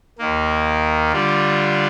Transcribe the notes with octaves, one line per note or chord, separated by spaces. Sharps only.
D#2 D#3 A#3
D3 G3 D4 F4